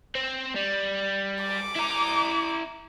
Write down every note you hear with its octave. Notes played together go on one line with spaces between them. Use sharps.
C4
G3
D6
E4 A#5